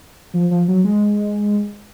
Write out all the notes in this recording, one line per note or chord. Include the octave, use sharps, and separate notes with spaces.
F3
F3
F#3
G#3